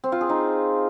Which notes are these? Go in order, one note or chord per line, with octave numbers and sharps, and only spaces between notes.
C4
F4
G#4
D#4